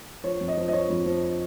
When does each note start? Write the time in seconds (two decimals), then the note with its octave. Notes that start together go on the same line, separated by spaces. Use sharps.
0.24 F3 C#5
0.41 F2
0.48 D#5
0.57 F3
0.68 D#5
0.73 F3 C#5
0.90 F2
1.06 F3